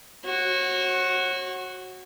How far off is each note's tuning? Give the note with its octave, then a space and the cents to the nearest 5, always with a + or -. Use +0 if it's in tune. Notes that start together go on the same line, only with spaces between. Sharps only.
F#4 +0 C#5 -35